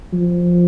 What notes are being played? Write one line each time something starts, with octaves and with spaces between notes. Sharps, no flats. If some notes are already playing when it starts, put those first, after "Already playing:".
F3